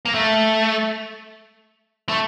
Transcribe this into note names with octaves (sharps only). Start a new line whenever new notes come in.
A#3
A3
A3